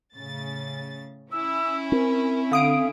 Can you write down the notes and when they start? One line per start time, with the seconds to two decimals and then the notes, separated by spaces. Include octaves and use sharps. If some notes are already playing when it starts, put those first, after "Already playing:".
0.14 A2 C#3 A6
1.32 C#4 E4 E6
1.92 C4 A#4
2.51 D3 F5 D#6 D7